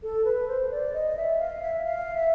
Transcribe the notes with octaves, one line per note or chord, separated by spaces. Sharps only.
A4
B4
C5
D5
D#5
E5
F5
E5
F5
E5